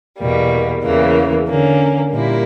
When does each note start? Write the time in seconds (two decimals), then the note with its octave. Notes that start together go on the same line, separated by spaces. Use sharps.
0.19 E2 B2 G3 A#3
0.82 E2 C#3 E3 A#3
1.46 D3 A#3 C#4
2.11 A#2 G3 A#3 E4